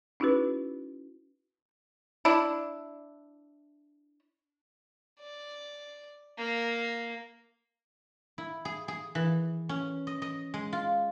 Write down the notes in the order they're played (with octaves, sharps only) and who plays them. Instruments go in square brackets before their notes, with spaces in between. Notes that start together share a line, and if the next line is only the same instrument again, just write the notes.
[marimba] C#4 D#4 E4 F#4 G#4 B4
[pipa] D4 E4
[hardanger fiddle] D5
A#3
[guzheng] E4
G#4
G#4
E3
C#4
D#5
D#5
G#3
F4